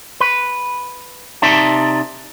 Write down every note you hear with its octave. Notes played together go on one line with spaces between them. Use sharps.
B4
C3 D#4 D5 E5 A5